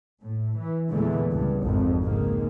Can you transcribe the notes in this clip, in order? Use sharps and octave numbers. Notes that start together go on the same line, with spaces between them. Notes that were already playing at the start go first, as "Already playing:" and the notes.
A2
E3
E2 A#2 D3 E3 G#3 A3
C#2 G2
G#1 F2
C#2 G#2 D#3 G#3 A#3